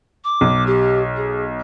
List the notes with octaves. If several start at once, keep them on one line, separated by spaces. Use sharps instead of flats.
D6
B1
G4
G#4